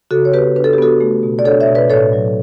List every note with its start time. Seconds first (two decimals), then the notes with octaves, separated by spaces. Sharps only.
0.11 C#3 F#4 A4
0.25 C#5
0.33 B3 G4 B4
0.56 D4 B4
0.64 A4
0.73 G4
0.78 B3 F#4 A4
1.01 A3
1.23 B2
1.39 D5
1.45 D4 A4 C#5
1.61 C#5 E5
1.68 B2
1.75 B4 D5
1.90 A2 A4 C#5
2.13 F#3